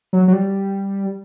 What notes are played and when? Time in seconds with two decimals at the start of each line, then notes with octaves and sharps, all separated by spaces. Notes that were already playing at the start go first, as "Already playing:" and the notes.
0.13 F#3
0.28 F#3
0.33 G3